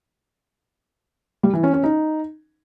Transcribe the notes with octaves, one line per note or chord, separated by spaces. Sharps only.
G3
E3
C#4
C#4
D#4